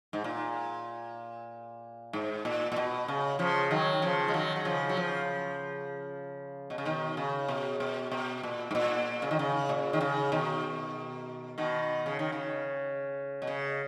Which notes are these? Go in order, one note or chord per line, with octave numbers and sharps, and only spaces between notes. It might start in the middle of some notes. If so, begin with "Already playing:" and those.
G#2
A#2
G#2
A#2
A#2
B2
C#3
C#3 F3
D#3 F#3
C#3 F3
G#3
D#3 F#3
F#3
C#3 F3
F#3
C#3 F3
B2
C#3
B2 D#3
C#3
B2
B2
B2
A#2
G#2
A#2
C#3
D#3
C#3
A#2
D#3
C#3
B2 D#3
B2 D#3
C#3
D#3
C#3
B2
C#3